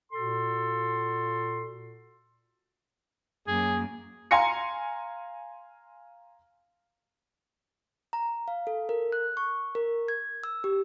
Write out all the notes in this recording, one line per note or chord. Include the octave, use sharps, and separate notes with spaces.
A#2 F#4 A4 C6
F#2 A#3 G#4
F5 G#5 A#5 C6 A#6 C#7
A#5
F5
A4
A#4
F#6
C#6
A#4
G#6
E6
G4